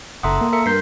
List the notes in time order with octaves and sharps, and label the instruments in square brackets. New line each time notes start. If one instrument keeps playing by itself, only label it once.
[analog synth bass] F#1 [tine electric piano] A4 E5 F#5 [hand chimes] A#5 C6 D#6
[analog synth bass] A#3
[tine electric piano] A4 E5 C#7 [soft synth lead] A#4
[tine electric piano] G2 C6 [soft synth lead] A#4 [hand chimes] G6 B6 C7